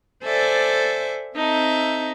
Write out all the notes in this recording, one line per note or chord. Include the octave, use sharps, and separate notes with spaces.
A4 C5 D5 E5 G#5
C4 D#4 A4 E5